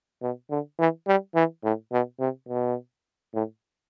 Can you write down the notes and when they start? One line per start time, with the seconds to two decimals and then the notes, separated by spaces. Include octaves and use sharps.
0.22 B2
0.50 D3
0.79 E3
1.07 G3
1.35 E3
1.64 A2
1.92 B2
2.20 C3
2.49 B2
3.34 A2